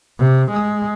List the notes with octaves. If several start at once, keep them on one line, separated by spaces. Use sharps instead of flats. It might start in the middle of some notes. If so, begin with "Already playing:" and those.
C3
G#3